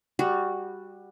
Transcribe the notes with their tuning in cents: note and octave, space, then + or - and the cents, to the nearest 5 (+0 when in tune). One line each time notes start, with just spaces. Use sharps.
G3 +15 F#4 +0